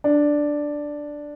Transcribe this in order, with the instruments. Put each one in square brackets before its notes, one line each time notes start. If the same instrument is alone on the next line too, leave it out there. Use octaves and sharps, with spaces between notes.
[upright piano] D4